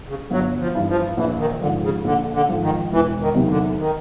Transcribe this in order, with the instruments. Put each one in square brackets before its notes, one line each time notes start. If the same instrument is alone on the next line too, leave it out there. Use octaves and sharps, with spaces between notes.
[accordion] C#3
[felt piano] G1 [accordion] F#3
[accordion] F3
[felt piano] G2 E3
[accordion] F3
[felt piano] A#1 [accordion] E3
[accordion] D#3
[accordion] D3 [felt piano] F3
[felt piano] G#2
[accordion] C#3
[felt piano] A#1 [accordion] D3
[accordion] D3
[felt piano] G#2 F3
[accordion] D#3
[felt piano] E1 [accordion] E3
[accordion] D#3
[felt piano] E2 C3 D#3 F#3
[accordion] C#3
D3
D#3